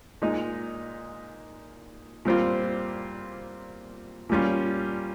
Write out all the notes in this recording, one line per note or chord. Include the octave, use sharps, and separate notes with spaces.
A#2 G#3 D#4
A#2 G3 C4 F4
A#2 G3 C#4 F4